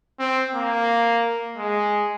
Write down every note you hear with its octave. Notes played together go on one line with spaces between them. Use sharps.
C4
A#3
G#3